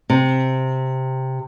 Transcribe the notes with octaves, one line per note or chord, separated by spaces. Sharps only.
C3